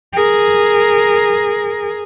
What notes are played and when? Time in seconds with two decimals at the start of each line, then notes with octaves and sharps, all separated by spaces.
0.13 G#4 A#4